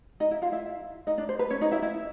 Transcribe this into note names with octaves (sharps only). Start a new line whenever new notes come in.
D#4 D#5
E4 E5
F4 F5
E4 E5
D#4 D#5
D4 D5
C5
B4
C#4 C#5
D#4 D#5
E4 E5
E4 E5